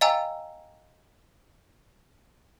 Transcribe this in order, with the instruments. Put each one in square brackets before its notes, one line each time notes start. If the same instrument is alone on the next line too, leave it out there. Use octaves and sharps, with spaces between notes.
[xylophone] D#5 F5 G5 G#5 A#5 E6